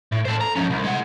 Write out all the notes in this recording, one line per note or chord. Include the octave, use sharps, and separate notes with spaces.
A2
A4 C5
A#5
F3 C#4
C2
G#3 F#5